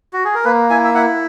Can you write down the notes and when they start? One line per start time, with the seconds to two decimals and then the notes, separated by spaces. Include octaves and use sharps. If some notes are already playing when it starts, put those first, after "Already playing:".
0.13 F#4
0.25 G#4
0.35 A#4
0.45 A#3 B4
0.70 E4 G#5
0.84 E5
0.95 E4 F#5